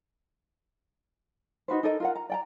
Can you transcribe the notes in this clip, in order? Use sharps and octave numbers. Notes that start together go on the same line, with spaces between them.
D#4 F#4 B4 C5
D#4 A4 A#4 D#5
F4 A#4 F#5
A#5
D5 G5 A#5